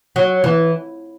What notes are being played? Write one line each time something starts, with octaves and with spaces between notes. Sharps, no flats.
F#3
E3